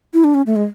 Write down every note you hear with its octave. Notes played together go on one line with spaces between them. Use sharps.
E4
D4
C#4
A3
G#3